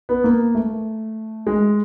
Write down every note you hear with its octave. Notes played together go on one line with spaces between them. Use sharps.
B3
A#3
A3
G#3